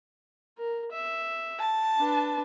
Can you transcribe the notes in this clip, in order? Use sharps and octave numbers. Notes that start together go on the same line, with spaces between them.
A#4
E5
A5
D4 B4